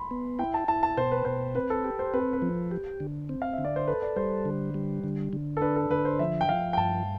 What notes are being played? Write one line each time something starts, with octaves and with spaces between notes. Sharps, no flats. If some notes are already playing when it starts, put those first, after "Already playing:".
Already playing: B5 C6
B3
E4 G5
A5
E4 A5
A5
B2 C5
B4
B2 C5
C4 B4
A4
G4
C5
C4 B4
B4
F3
G4
D3
C4
F5
E5
D3
D5
C5
A4 B4
D5
G3 C5
D3
G3
D3
D3
A4
D4 B4
A4
D3 B4
C5
F3 E5
G5
F3 F5
G5
G2 A5